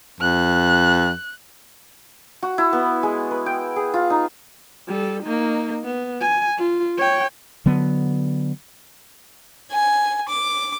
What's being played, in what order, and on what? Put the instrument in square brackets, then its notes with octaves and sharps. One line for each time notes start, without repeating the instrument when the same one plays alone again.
[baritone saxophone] F2 [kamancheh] F#6
[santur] F#4
E4
B3
G#3
B4
G5
G#4
F4
D#4
[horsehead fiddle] G3 A4
A#3 D#4
B3
G#5
F4
C#5 G5
[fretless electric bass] D3 F#3 B3
[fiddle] G#5
D6